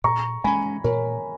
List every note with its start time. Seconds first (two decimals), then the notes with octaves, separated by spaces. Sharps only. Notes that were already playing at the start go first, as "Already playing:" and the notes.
0.04 A#2 A#5 C#6
0.44 G#3 C#4 G#5 B5
0.84 A#2 A#4 C#5